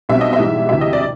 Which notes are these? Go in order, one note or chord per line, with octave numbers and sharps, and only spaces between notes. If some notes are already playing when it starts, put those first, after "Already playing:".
B1 B2 G3 C4 E5
D#5
E5
G#2 E3 G3
D2 C3 E3 E5
D#5
D5